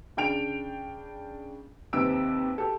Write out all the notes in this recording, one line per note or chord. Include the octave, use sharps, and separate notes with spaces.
C#3 D4 G5 D7 F7
D#2 C3 B4 E6 D7
G4 A4